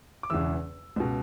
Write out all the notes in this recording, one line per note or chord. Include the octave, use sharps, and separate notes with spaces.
D6
E1 E2 C#3 E3 E6
C#2 B2